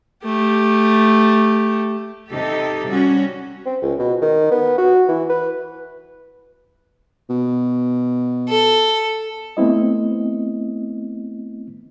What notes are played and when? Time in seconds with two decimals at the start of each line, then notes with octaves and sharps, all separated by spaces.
0.24 A3 G4
2.29 C3 D#4 G4 A4
2.88 G3 C#4 F#4
3.66 C4
3.82 C#2
3.99 B2
4.21 D#3
4.51 B3
4.78 F#4
5.09 E3
5.29 B4
7.30 B2
8.49 A4
9.57 A3 B3 C4 E4 D#5